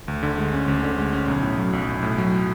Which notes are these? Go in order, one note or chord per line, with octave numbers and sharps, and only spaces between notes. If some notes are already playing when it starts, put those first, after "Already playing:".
D2
D3
G#3
C#4
D2
D3
G#3
C#4
B1
A2
F#3
B1
B1
A2
F#3